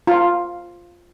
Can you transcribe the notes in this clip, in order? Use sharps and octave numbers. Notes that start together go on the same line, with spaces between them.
F4